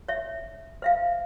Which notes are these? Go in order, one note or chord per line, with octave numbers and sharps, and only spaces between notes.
C#5 E5
C5 E5 F5